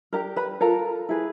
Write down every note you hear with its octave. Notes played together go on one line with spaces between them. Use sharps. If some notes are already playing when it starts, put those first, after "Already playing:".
D4 G4 A#4 A#5
B4 B5
F4 A4 A#4 A#5
E4 G#4 B4